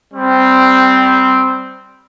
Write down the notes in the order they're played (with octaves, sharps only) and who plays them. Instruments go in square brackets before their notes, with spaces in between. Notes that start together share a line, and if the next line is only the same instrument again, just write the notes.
[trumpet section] G3 C4